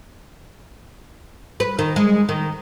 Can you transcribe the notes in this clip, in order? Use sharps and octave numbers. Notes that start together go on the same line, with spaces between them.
B4
D#3
G#3
D#3